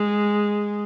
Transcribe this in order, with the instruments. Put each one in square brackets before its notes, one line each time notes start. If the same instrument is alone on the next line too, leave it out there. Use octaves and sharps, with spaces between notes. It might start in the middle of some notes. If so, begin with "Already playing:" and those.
Already playing: [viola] G#3